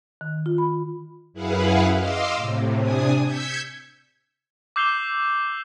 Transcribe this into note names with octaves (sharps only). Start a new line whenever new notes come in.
D#3
F4
B5
F#2 E4 G#4 B4 F5 F#5
D#5 F5 C6 D6 E6
A2 C3
C3 D4 G#5 D#6
E6 G6 G#6 B6 C#7
D6 E6 G6 C7 F7 G7